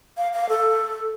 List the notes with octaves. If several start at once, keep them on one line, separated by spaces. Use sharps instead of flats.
F5
F5
A4